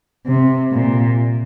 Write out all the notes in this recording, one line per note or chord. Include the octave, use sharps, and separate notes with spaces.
C3
A#2